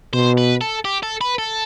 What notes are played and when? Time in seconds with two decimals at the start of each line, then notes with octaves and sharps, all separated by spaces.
0.13 B2 C5
0.38 B4
0.61 A4
0.85 G4
1.03 A4
1.21 B4
1.38 A4